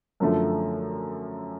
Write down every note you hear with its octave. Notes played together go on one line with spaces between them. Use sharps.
F#2 D3 F3 A3